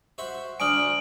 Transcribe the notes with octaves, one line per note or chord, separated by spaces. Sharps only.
F#4 C5 E5
D2 D4 G#5 C#6 D#6 F6 D7 F#7